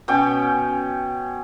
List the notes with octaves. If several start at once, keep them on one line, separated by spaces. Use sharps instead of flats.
B2 C#4 G5